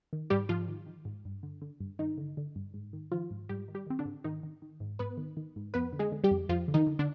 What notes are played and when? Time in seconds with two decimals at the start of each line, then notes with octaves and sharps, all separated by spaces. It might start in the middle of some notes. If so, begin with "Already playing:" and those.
0.13 D#3
0.30 G#2 G3 G4
0.49 G#2 F3 F4
0.68 D#3
0.86 D#3
1.05 G#2
1.25 G2
1.43 D3
1.62 D3
1.80 G2
1.99 G2 D#3 D#4
2.18 D3
2.37 D3
2.56 G2
2.74 G#2
2.93 D#3
3.12 D#3 F3 F4
3.31 G#2
3.49 G#2 G3 G4
3.68 D#3
3.74 G3 G4
3.86 D#3 C4
3.99 D3 D4
4.05 G#2
4.24 G#2 D#3 D#4
4.43 D#3
4.62 D#3
4.80 G#2
4.99 G#2 B3 B4
5.17 D#3
5.37 D#3
5.56 G#2
5.74 F2 B3 B4
5.93 D3
5.99 G#3 G#4
6.12 D3
6.24 G3 G4
6.31 F2
6.49 F2 F3 F4
6.68 D3
6.74 D#3 D#4
6.87 D3
6.99 D3 D4